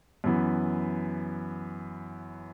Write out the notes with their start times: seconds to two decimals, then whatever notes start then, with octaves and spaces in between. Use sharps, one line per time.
0.24 F#2 E3 B3